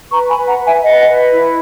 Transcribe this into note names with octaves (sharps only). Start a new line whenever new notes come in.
B4 A#5 C#6
G#5 B5
B4
F#5 A#5
B4
E5 G#5
B4 D#5 F#5
B4
E4